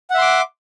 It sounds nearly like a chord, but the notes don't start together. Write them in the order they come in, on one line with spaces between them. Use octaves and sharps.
F#5 E5 C6 D6